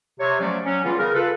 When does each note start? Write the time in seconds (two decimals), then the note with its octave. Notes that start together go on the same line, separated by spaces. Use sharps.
0.20 C3 C#5
0.39 F3 F#3 A3 C#4 D5
0.64 F#3 C#4
0.84 C#3 E3 G3 B3 F4
0.98 C#3 A#4
1.13 F4 A4 B4